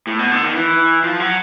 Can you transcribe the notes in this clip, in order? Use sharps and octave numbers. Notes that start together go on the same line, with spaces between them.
A2
B2
D3
D#3
E3
F3
F#3